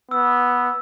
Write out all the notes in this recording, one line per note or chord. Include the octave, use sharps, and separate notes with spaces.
B3 E6